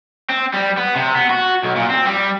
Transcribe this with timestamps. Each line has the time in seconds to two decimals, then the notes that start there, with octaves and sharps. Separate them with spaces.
0.29 C4
0.53 G3
0.77 B3
0.96 C3
1.15 B3
1.30 F#4
1.64 B1
1.77 A#2
1.91 C4
2.07 G3